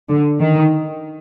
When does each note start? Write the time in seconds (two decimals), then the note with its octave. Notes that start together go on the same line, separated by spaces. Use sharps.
0.09 D3
0.40 D#3